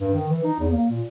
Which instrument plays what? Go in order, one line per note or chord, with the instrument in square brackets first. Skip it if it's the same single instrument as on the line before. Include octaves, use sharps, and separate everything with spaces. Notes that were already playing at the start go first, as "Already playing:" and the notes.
[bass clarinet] G2
D#3
E3
D#4
E2
A#3
A#2